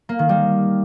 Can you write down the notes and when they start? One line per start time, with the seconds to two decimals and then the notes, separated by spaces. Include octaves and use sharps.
0.09 A#3
0.19 D#3
0.29 G3